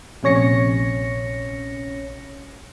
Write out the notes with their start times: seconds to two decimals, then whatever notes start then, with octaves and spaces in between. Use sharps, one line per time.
0.23 A#1 C3 C#4 C#5 A#6 C#7